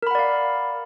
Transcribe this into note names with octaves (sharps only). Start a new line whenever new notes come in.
A#4 D5 F5 F#5 B5